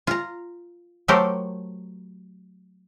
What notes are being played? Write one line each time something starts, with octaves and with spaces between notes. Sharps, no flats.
F4 A#5
F#3 A3 G4 A#4 C5